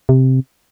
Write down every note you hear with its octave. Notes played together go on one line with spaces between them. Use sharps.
C3